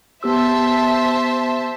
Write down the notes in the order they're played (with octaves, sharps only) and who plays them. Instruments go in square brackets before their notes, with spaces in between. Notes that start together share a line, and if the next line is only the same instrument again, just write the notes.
[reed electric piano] B3 G4 E6 [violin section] C5 E5 A5